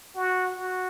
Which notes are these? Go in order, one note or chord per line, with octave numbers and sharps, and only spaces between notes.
F#4
F#4